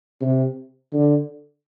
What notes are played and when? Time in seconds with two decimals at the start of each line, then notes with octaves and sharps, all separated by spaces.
0.21 C3
0.93 D3